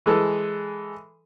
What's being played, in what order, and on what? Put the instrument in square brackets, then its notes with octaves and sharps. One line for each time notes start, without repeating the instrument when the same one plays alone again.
[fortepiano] E3 G#3 A4